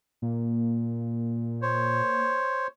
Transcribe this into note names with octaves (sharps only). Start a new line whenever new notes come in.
A#2 A#3
C5 C#5